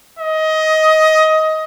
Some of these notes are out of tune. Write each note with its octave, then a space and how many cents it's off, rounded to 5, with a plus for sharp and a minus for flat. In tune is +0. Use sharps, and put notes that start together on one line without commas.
D#5 +20